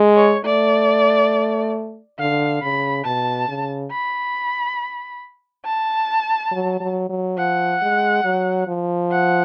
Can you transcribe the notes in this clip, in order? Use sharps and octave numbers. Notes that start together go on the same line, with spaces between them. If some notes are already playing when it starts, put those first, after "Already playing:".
Already playing: G#3
C#5
A3 D5
D3 F5
C#3 B5
B2 A5
C#3
B5
A5
F#3
F#3
F#3
F3 F#5
G#3
F#3
F3
F#5